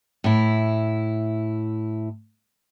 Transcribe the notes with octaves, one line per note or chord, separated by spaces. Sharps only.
A2 E4